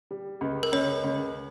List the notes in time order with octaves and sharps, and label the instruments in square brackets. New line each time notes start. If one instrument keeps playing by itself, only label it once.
[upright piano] G3
C#2
[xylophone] A#4
[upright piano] C#2 [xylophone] C#5
[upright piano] C#2